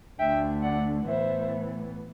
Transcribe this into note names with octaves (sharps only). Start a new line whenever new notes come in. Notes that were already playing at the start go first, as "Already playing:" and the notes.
D2 D3 A3 E5 G5
D5 F#5
A2 E3 B3 C5 E5